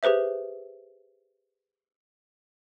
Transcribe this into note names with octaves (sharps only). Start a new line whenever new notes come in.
G4 G#4 B4 C5 E5